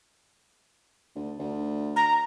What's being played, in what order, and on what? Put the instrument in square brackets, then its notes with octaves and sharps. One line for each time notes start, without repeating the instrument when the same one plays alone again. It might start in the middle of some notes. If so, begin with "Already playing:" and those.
[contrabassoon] D2
D2
[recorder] A#5